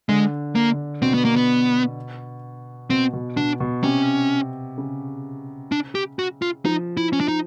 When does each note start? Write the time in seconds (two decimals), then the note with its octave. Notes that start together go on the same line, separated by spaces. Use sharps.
0.09 D3 G#3
0.55 A#3
0.71 D3
1.02 B2 C4
1.14 B3
1.25 A#3
1.36 B3
2.90 B2 C4
3.13 B2
3.37 B2 D4
3.60 B2
3.83 C3 C#4
4.78 C#3
5.72 D4
5.95 G4
6.19 F#4
6.42 F4
6.65 F3 D#4
6.97 E4
7.13 C#4
7.20 D4
7.28 D#4